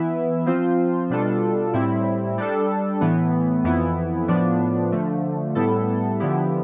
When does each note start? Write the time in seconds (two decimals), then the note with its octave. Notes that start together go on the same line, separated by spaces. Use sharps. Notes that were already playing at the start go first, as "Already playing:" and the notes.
Already playing: E3 B3 E4 B4 E5
0.46 F3 C4 F4 C5
1.10 B2 G3 D4 F4 A4
1.73 A2 G3 C4 E4
2.38 G3 D4 A4
3.01 A2 E3 B3
3.64 F2 E3 B3 E4
4.28 A2 F3 B3 D4
4.92 D3 F3 A3
5.55 A2 G3 B3 E4 A4
6.20 D3 F3 B3 E4 G4